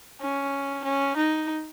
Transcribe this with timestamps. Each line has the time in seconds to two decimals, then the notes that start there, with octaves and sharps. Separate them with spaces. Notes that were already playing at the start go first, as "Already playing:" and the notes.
0.21 C#4
0.84 C#4
1.16 D#4